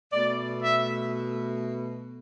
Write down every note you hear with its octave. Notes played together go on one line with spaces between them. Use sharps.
B2 A3 D5
E5